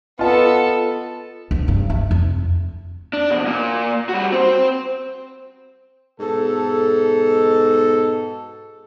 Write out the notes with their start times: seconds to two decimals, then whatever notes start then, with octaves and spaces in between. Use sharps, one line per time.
0.19 B3 F4 A4 D#5 A5
1.51 D2
1.68 G2
1.90 A3
2.11 F2
3.13 D4
3.31 F2 B2
3.47 A#2
4.09 G3 F#4
4.32 C4 C5
6.20 G#2 B2 A4